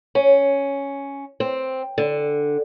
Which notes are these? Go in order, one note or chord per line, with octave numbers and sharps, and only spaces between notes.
C#4
C4
D3